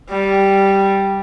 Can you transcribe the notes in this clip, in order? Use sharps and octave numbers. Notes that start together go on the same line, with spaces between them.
G3